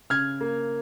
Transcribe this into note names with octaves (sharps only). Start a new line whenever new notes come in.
C#3 F6 G#6
A#3